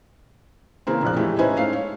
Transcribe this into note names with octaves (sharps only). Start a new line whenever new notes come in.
C#3 E3 A#3 C4
E1 A#1 F3 F#6
A2 E3 G#3 A3 G4
C#4 D#4 E4 B4 C5 G#5
G#2 A3 C#4 F5 C7
C#5